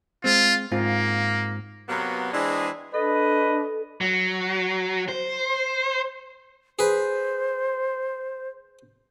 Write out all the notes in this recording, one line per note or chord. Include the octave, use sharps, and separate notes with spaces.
G#3 C4 F4
G#2 A#3 C4 F4
C3 F#3 A#3 B3
E3 G#3 C4 D4 G#4
D4 A4 B4 D#5
F#3
C5
G#4 B4 C5